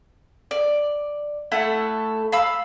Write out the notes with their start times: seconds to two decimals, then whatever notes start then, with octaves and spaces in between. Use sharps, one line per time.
0.51 D5
1.51 A3 E4 A4 F#5
2.32 F5 B5 E6